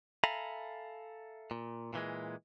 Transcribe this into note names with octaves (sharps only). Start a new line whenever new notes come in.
A4 E5 F5 G#5 A#5 B5
A#2
A#2 E3 G#3